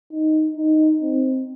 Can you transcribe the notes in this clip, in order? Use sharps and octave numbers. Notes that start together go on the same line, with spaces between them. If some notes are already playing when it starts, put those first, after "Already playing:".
D#4
D#4
C4